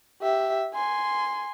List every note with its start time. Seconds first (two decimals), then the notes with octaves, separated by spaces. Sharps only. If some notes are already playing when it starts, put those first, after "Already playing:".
0.22 G4 E5
0.74 G#5 C6